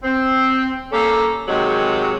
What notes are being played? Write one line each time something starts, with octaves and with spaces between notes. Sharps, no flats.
C4
A#3 C#4 G4 A4
C3 D#3 F#3 G#3